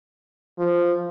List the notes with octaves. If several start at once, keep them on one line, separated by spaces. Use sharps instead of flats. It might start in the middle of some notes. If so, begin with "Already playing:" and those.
F3